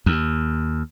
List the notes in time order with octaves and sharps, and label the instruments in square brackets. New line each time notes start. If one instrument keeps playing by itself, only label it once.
[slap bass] D#2